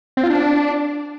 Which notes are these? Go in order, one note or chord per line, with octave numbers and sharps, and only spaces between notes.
C4
F4
D4